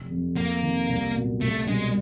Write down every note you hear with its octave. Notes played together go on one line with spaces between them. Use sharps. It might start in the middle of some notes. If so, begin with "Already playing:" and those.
Already playing: F1
F2 C3
F2 A#3
C3 D#3
C2
A#2 F#3 B3
C2 A3
B2 G3 G#3 B3 D4